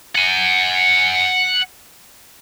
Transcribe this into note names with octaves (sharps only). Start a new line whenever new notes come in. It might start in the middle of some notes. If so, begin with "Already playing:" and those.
F#5 G#5